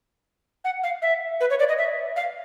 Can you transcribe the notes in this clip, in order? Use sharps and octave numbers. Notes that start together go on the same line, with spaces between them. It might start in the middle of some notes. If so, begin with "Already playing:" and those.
F#5
F5
E5
B4
C#5
D5
D#5
E5
F5